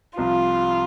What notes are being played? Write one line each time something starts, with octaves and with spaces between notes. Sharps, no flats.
C2 C3 F3 F4